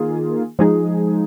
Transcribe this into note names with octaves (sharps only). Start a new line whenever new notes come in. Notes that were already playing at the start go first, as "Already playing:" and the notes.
Already playing: D#3 A#3 F4 G#4
F3 G#3 D#4 G#4